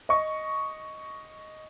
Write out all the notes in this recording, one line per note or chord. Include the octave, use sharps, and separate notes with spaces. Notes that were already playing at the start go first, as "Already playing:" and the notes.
D#5 C#6